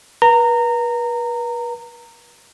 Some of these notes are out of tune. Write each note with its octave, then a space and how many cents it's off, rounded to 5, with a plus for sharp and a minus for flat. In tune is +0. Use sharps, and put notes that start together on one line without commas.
B4 -40 A#5 -20